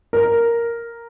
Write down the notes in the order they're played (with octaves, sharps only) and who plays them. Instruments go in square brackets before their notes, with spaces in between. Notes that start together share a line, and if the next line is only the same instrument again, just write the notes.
[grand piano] A#4